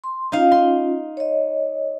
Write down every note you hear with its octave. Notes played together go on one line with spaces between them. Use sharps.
C6
C#4 D#4 F4 F5
C6
C#5 D#5